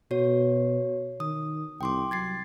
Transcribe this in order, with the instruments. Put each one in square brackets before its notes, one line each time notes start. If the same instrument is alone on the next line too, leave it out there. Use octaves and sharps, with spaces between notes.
[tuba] B2 [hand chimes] F#4 C#5
[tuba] D#3 [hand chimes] D#6
[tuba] C2 [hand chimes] G5 C6 D6
[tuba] F#3 [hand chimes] G#6 A6 C7